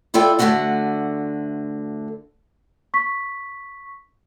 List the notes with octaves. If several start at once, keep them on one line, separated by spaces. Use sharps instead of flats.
E4 F4 A4 D5 G5
D2 D3 A3 C#4 F#4 F#5
C#6 B6